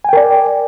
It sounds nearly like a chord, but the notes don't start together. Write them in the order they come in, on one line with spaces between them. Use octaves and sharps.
G#5 G5 A#4 D5